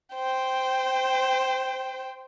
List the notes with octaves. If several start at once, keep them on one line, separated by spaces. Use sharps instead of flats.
C5 G5